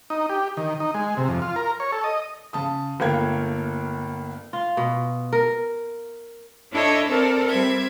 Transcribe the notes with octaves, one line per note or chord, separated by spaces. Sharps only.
D#4
G4
D#3
D#4
G#3
C3
F2
F4
A#4
C#5
A4
D#5
C#3 A5 D#6
G1 A3 A#3 F5 G5 G#6
F4
B2
A#4
D4 E4 A4 C#5 D#5 E5
C4 A4 A#4 D5
G3 C4 E5 G#6